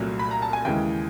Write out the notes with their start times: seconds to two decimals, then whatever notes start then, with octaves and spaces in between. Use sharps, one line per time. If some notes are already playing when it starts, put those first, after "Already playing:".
Already playing: C2 A#2 F#3 A3
0.19 B5
0.31 A#5
0.42 A5
0.53 G#5
0.65 D#2 C#3 E3 G#3 G5